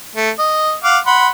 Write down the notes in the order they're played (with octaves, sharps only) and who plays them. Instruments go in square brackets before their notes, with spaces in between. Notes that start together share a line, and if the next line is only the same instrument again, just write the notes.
[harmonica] A3
D#5
F5 F#5 D6
F#5 B5 C6